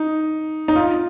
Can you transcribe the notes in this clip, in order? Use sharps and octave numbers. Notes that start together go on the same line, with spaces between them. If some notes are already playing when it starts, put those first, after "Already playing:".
Already playing: D#4
D#4
F4